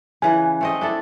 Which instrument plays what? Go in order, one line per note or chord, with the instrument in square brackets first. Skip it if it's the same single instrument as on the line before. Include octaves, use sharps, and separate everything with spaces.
[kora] C#3 E3 B4 [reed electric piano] G#5
[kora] A3 C4 D#5
D4 E4 A4